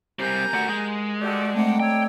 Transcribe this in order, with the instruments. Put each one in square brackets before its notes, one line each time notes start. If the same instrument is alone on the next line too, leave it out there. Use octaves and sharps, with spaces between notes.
[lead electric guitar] G3 C4 [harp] G4 A#4 [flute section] G#5 A#5 G6
[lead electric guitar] A3 F#4 [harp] F#5
[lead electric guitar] G#3
[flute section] F#4 G4 A4 [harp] D5 G6
[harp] A3 C4 D#4 [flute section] F#5 G5 D6
[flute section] C#5 E6 [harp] D5 [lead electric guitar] G5